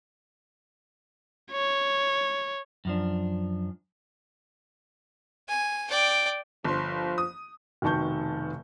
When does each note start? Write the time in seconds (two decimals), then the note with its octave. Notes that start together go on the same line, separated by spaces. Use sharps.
1.51 C#5
2.85 F#2 F3 D4
5.48 G#5
5.90 D5 G5
6.64 G1 F3 C6
7.18 D#6
7.82 F1 B2 D#3 A5 C#6 G6